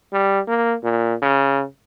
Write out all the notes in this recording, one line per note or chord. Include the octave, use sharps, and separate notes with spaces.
G3
A#3
A#2
C#3